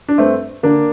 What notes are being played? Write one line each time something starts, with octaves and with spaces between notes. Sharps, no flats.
D4
G2 A3 C4
D3 A#3 D4